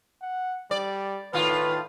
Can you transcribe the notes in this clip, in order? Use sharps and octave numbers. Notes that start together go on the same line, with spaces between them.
F#5
G3 D5
A2 D#3 F4 B4